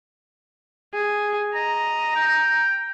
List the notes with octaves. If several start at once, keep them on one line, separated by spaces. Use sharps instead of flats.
G#4
D#5 A#5
G5